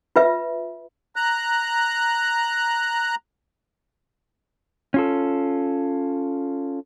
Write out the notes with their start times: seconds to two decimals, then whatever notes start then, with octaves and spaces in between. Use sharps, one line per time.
0.16 F4 B4 E5
1.16 A#5 F#6
4.94 C#4 F4 A4